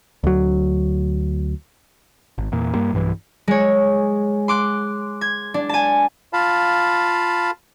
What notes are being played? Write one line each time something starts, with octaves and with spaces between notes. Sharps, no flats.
D2 F#3
G#1
E2 A#2
G2 G3 A#3
B1 G2 E3
G#3 C#5
C6 D6 F#6
G#6
D4
G#5 A5
F4 F5 A5 B5